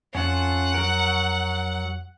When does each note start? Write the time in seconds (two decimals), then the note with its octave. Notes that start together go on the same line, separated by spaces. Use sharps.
0.15 F2 C#4 F4 A4 F#5
0.74 F#3 A#4